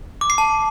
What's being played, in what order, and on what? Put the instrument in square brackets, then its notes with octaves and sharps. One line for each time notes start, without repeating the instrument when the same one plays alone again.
[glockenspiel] D6
C7
A5